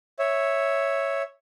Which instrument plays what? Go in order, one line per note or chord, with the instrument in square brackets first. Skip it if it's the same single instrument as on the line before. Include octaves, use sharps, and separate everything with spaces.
[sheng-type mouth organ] C#5 E5